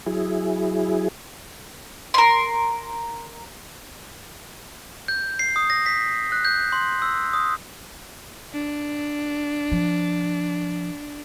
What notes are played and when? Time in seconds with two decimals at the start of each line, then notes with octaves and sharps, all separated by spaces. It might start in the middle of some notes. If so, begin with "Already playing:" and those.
0.06 F#3 E4 G#4
2.14 A#4 C6
5.08 G6
5.39 C7
5.56 D#6
5.70 A#6
5.86 B6
6.32 F#6
6.45 G6
6.73 C6
7.02 E6
7.33 D#6
8.53 D4
9.72 F3